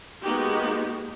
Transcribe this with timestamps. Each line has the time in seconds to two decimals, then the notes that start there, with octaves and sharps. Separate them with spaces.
0.23 G#3 A#3 B3 D#4 F#4 G4